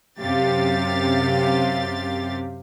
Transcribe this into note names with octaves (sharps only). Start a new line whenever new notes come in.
F#2 C3 G4 F5 A6